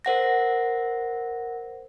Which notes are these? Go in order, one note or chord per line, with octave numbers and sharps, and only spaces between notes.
A#4 C5 F#5 A#6